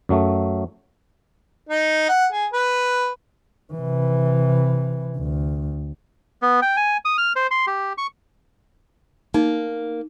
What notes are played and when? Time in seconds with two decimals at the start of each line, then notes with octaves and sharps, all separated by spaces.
0.09 F#2 F#3 A3
1.69 D#4
2.09 F#5
2.32 G#4
2.53 B4
3.73 C3 E3
5.17 D2
6.42 B3
6.62 G5
6.77 G#5
7.05 D#6
7.18 F6
7.36 C5
7.51 C6
7.67 G4
7.98 C#6
9.34 A#3 D#4